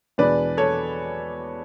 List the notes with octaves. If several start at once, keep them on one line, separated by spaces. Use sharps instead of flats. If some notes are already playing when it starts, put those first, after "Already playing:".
E2 B2 G#3 D4 B4 D5
A4 C#5